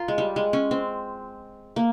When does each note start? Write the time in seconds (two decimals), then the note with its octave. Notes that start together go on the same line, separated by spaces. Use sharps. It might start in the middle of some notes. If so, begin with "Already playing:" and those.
Already playing: F4 A#4
0.08 G#3
0.18 G3
0.36 G#3
0.53 C#4
0.71 C4
1.76 A#3